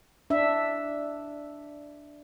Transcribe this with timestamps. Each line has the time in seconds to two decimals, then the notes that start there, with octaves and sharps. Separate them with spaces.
0.30 D4 E5